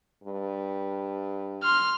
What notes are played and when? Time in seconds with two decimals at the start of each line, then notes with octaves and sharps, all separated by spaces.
0.24 G2
1.63 C6 F6